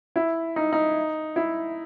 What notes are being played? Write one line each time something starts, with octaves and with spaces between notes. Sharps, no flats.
E4
D#4
D#4
E4